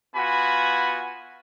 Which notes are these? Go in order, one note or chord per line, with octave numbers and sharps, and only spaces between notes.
B3 F4 F#4 G#5 B5